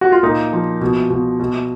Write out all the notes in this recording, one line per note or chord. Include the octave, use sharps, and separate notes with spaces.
F#4
F4
A#2 D#4
F3
B2
B2
B2